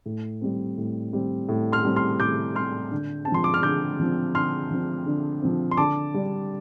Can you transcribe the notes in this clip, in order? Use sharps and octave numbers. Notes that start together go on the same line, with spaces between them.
A2
G3 C4
A2
G3 C4
A2
C6 F6
G3 C4
C6 F6
A2 D6 G6
G3 C4 C6 F6
D3
C4 A5
F3 C6
D6
F6
D3 D6 G6
F3 C4
D3 C6 F6
F3 C4
D3
F3 C4
C6
D3 A5 D6
G3 D4